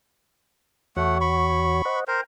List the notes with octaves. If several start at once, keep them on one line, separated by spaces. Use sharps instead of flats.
E2 A3 F#4 C#5 F#5
B5 C#6
C5 D#5 F#5
A#4 C5 G5